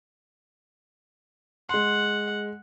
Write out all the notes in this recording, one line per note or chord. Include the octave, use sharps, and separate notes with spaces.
G#3 F#5 C6